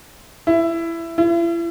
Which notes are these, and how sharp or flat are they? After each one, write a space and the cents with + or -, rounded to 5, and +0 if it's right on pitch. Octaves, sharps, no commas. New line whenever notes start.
E4 +15
E4 +40